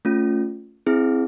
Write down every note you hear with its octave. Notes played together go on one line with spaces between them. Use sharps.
A3 C#4 F4
C4 E4 G#4